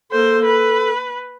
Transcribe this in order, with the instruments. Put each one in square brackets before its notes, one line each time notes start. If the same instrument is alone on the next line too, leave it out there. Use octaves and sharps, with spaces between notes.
[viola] A#3 C5 [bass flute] A4
[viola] B4